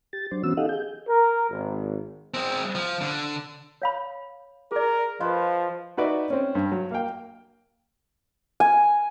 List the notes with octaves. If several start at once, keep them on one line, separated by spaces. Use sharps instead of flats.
G4 A6
F#3 D4 C5
E3 B3 C#4 F#4 E6
D#4 G4 A4 D#5 F5 F#5
G#4 G6
A#4
G#1
G#3 C4
F3
D3
C#5 F5 B5
G#4 A#4 D5
F3 F4 B4 C5 D#5
D#4 F#4 B4 D5 E5
C4 C#4
G2
F#3
A#3 F5 G5
G#5